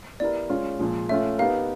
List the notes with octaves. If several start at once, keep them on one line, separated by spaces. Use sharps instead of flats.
B3 E4 G4 A#4 D5
G#3 C#4 F4
A#2 F3 G#3
A3 C#4 F4 E5
B3 D#4 G4 A#4 F5